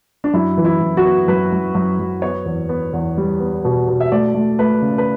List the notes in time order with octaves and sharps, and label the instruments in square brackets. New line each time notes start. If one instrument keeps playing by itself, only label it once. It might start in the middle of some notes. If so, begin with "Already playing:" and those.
[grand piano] D4
F#2 E4
E3
E4
F#2
F#4
B3
F#2 B4
F#2
F#2
F#2
B3 C#5
E2
B3
E2
G3
B3
B2
B2
E5
A3 D5
A3
A3 B4
C#3
B4